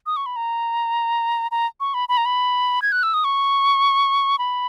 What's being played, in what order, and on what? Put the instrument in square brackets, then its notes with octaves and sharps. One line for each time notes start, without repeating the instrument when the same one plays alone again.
[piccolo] D#6
C#6
B5
A#5
A#5
C#6
B5
B5
A#5
B5
G#6
F#6
E6
D#6
C#6
B5